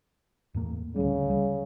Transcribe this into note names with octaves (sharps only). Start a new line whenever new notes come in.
E2 A2 A#3
D2 C#3 G3
G3